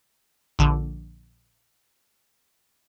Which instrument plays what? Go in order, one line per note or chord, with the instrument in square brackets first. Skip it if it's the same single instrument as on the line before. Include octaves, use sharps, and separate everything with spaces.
[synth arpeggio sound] A#1 D3